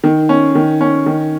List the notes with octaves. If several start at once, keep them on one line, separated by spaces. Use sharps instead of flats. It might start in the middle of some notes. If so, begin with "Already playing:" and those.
D#3
C#4
D#3
C#4
D#3